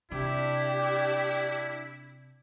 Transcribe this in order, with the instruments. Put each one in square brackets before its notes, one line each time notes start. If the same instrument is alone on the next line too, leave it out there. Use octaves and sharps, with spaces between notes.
[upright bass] C3 [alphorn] D4 [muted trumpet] E4 [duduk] G4